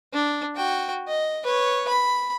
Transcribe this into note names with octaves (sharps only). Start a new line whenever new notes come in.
D4
F#4 G5
D#5
B4 C#5
B5